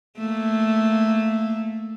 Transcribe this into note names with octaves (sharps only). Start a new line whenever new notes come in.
A3 A#3